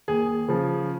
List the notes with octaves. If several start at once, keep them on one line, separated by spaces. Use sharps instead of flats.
D#2 G#4
C#3 F3